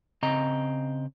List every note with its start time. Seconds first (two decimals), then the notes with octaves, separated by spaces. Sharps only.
0.23 C#3 C4 D#5 A#5